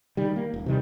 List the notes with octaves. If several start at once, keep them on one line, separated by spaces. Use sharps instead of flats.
D#3 G3
A#3
D#1
C3 D#3 G3